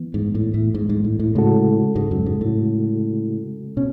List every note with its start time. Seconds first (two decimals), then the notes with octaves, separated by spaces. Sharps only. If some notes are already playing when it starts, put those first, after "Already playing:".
Already playing: E3 B3
0.14 G#2
0.35 A2
0.54 A2
0.74 G#2
0.89 G#2
1.04 A2
1.19 A2
1.35 A2 C#3 G#3 C#4 F#4 A4
1.96 G#2
2.11 F#2
2.26 G#2
2.41 A2
3.77 B2 C#4